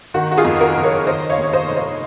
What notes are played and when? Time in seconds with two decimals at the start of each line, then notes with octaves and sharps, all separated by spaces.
0.14 D#3 F#4
0.31 F#4
0.37 F4 G#4
0.45 F2
0.60 F#4 A#4
0.76 F#1
0.83 A#4 C#5
1.07 D#3 C5 D#5
1.30 C#5 F5
1.38 D#2
1.43 C#5
1.53 C5 D#5
1.68 F1
1.76 C5 D#5